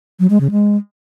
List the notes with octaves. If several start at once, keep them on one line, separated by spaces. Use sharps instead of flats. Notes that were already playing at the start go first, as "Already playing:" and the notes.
F#3
G#3
C#3
G#3